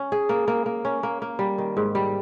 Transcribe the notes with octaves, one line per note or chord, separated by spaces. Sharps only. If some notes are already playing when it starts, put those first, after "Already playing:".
Already playing: C#4
G#4
A#3
A#3
A#3
C#4
A#3
A#3
G3
D#3
G#2
G3